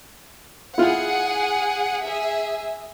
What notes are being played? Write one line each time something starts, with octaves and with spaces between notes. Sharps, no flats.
E4 F4 G#4 F#5
G#4 E5